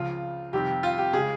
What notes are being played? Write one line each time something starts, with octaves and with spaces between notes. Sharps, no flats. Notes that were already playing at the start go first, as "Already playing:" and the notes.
Already playing: C#2 C#3 F3 F4
F2 C3 D#3 G3 C4 G4
F4
G4
C#3 G#3 G#4